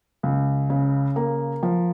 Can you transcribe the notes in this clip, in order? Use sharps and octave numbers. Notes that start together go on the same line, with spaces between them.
C#2
C#3
A#3
F3